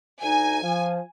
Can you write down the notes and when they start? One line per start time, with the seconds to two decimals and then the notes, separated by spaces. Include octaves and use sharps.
0.22 D2 D#4 G#5
0.63 F3